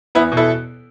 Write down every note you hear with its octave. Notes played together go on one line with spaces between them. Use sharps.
E2 B3 E4
B2
E4 A4